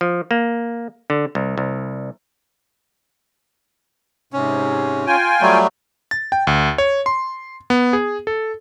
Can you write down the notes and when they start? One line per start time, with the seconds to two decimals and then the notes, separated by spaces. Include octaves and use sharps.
0.01 F3
0.31 A#3
1.10 D3
1.35 C2
1.58 C2
4.33 G#2 C3 C#4
5.07 F4 G5 G#5
5.41 F#3 G3 A3
6.11 A6
6.32 G5
6.47 D2
6.78 C#5
7.06 C6
7.70 B3
7.93 G#4
8.27 A4